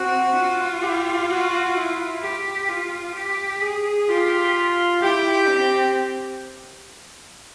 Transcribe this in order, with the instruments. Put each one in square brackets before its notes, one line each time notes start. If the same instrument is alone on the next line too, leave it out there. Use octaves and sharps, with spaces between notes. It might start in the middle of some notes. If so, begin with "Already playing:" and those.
Already playing: [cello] C4 [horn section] F#4
[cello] F4
[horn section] G4
F#4
E4
[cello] G4
F4
G4
G#4
[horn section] F4 [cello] G4
[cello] E4 [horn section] G4
[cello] C4